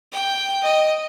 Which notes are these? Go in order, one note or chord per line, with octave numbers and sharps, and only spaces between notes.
G5
D#5